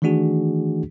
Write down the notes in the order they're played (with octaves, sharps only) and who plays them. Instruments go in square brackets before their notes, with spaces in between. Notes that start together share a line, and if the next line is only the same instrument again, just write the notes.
[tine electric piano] D#3 E3 A3 D4 F#4 G#4